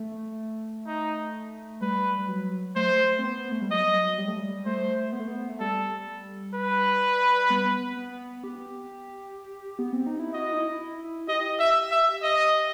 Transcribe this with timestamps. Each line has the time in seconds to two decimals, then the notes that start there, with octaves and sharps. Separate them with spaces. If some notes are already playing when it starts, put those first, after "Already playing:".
Already playing: A3
0.87 D#4
1.81 G3 B4
2.18 G3
2.28 F#3
2.76 A3 C5
3.19 C4
3.24 B3
3.52 A3
3.62 G3
3.71 F#3 D#5
4.18 G3
4.28 A3
4.37 G3
4.66 A3 C5
5.13 B3
5.20 A3
5.28 B3
5.49 A3
5.60 G3 A4
6.54 B4
7.50 B3
7.96 B3
8.44 G4
9.79 B3
9.93 C4
10.06 D#4
10.19 E4
10.34 F#4 D#5
10.53 D#4
10.57 E4
10.81 E4
11.04 E4
11.28 G4 D#5
11.60 E5
11.91 E5
12.23 D#5